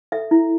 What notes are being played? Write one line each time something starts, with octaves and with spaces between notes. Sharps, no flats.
A4 E5
E4